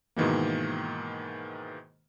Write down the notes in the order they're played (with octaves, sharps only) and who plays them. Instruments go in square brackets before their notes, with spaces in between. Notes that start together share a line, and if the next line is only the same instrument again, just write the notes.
[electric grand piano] G#2 B2 D#3 E3 A#3